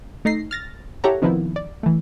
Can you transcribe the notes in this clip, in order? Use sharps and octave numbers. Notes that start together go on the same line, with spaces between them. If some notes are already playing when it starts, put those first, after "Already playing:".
A3 D#4 A#6 C7
F6 A6 A#6
E4 G4 A4 C#5 F#5 A#5
C3 D#3 F3 B3 D#4 E4
D5
E3 A3